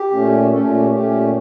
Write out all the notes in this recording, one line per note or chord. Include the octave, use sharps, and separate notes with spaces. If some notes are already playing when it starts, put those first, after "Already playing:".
Already playing: G4
A#2 A3 C#4
A#2 A3 C#4 A4
F4
G4
A#2 A3 C#4 G4